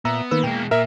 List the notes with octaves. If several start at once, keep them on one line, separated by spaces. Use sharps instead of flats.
A#2 B3 E5 A#5 E6
D#3 A#3 B4 E6
B2 G#3 G5
A#2 A#4 E5